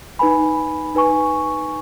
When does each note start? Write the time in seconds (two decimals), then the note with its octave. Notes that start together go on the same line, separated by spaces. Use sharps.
0.19 D#4 B4 G#5 B5
0.95 D#4 B4 G#5 C#6